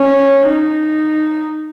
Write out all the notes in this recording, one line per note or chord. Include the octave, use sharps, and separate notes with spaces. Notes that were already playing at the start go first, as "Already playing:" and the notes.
Already playing: C#4
D#4